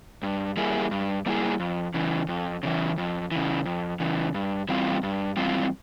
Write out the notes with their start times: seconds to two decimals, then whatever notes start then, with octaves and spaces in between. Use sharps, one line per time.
0.23 G2
0.57 G3 A#3 E4 G#4
0.91 G2
1.26 G3 A#3 E4 G#4
1.60 F2
1.94 C#3 E3
2.29 F2
2.63 C#3 E3
2.98 F2
3.31 C#3 E3
3.66 F2
4.00 C#3 E3
4.34 G2
4.69 E3 G3 C4 F4
5.03 G2
5.37 E3 G3 C4 F4